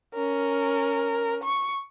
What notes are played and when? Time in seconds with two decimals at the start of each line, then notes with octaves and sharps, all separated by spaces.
0.14 C#4 A#4
1.43 C#6